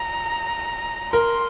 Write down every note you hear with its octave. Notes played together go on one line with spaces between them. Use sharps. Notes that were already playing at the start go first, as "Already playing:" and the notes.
Already playing: A#5
A#4 C6